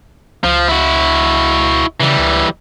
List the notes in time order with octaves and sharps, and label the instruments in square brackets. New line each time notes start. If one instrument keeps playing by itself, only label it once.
[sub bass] C#2 [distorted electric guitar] F3
[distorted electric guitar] E4 F#4
[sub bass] C#3 [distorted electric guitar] E3 G3
[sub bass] C#2